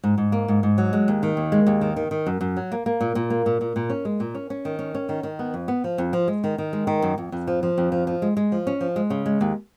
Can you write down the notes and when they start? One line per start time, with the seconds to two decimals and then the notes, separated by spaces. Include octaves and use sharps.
0.04 G#2
0.18 G#2
0.32 A#3
0.48 G#2
0.63 G#2
0.78 F#3
0.93 G#3
1.08 D#2
1.23 D#3
1.37 D#2
1.52 G#3
1.67 D#2
1.81 D#3
1.96 D#3
2.11 D#3
2.27 F#2
2.41 F#2
2.57 F#3
2.72 A#3
2.86 A#3
3.01 A#2
3.15 A#2
3.30 A#3
3.46 A#2
3.61 A#2
3.76 A#2
3.90 C#4
4.05 G#3
4.20 A#2
4.35 C#4
4.50 C#4
4.65 D#3
4.79 C#4
4.95 C#4
5.09 D#3
5.23 D#3
5.39 B3
5.54 F2
5.68 B3
5.84 F3
5.98 F2
6.13 F3
6.28 G#3
6.44 D#3
6.58 D#3
6.73 G#3
6.87 D#3
7.02 F#2
7.18 F2
7.32 F2
7.47 F3
7.63 F3
7.78 F2
7.92 F3
8.07 F3
8.22 G#3
8.37 G#3
8.52 F3
8.67 C#4
8.81 F3
8.96 G#3
9.10 C#3
9.26 G#3
9.41 D#2